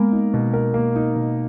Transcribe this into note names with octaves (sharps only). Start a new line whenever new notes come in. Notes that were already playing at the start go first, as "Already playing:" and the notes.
Already playing: G#3 A#3 B3 A#4
D#4
B2
A#4
A#3
D#4
B2